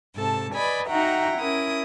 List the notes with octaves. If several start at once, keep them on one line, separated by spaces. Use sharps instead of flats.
G#2 C3 A4 A5
B4 D5 D#5 G#5 B5
D#4 F#4 E5 F#5 G5 A#5
C#4 E4 A#4 D#6